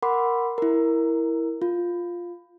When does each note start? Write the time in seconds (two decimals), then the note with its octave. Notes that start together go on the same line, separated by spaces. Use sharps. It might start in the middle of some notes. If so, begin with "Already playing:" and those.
0.02 A#4 F#5 B5 C6 D6
0.58 E4 A#4
1.62 F4